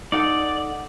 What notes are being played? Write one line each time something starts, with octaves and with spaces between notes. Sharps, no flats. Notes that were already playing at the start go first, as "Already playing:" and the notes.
D#4 A4 D5 F#5